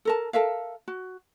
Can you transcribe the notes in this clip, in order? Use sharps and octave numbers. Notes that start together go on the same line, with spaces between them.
A4 A#4 A5
A4 A#4 E5 F5
F#4